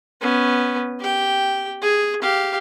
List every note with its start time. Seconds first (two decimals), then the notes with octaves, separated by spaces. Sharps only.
0.21 B3 C#4
1.00 G4 G5
1.81 G#4
2.21 G4 F5